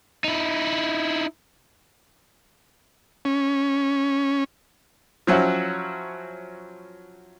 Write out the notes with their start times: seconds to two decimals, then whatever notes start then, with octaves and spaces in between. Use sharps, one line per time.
0.24 D#4 E4
3.25 C#4
5.27 F3 F#3 C#4 E4 F#4